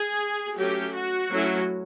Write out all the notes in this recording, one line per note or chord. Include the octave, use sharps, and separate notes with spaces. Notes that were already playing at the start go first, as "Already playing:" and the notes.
Already playing: G#4
F#3 A3 C#4 G4
F#4
F#3 A3 C#4 E4